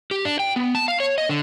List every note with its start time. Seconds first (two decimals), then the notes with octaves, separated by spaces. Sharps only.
0.11 G4
0.25 D4
0.40 G5
0.56 B3
0.75 A5
0.88 F5
1.00 C#5
1.18 D#5
1.29 D3